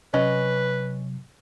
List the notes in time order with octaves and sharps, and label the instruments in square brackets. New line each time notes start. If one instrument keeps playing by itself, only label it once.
[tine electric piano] C3 F#3 [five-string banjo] C#4 D#5 [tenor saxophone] B4